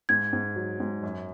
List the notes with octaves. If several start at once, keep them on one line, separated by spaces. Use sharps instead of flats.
G#2 G#6
G#2
F#3
G#2
F#2